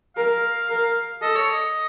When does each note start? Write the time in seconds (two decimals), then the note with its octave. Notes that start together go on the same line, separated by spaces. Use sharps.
0.17 A#4 F5
0.70 A#4
1.22 A4 D#5
1.36 C#5
1.50 D#5